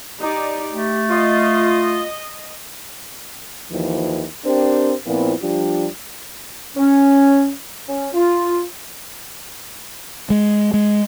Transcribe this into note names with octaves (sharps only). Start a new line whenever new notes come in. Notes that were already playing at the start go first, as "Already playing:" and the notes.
D#4 G4 D5
A3 G4
F4 D#5
D#2 E3 F3
C4 D4 G4 A#4 C5
A#2 F3 B3 C4 E4
F3 G3 D4 F4 G4
C#4
C#4
F4
G#3
G#3